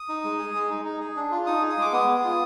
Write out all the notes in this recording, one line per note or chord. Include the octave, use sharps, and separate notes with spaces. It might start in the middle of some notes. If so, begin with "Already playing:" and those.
Already playing: D#6
D#4
G#3
G#4
G#3
D#4
D#4
G#4
D4
F4
D#4 D#6
G#4
D#6
G#3 D6
B3 D#6
G#4
F4